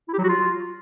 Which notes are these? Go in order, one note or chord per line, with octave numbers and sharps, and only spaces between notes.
E4
G4
F#3
F#4
F4